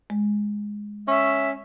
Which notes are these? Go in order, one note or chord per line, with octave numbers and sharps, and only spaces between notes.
G#3
C#4 E5